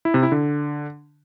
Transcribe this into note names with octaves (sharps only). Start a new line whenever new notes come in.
E4
C3
E4
D3